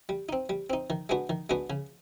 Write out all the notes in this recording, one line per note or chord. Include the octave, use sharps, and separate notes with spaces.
G3
C4 D#4
G3
C4 D#4
D#3
G#3 B3 D4 F#4
D#3
G#3 B3 D4 F#4
C#3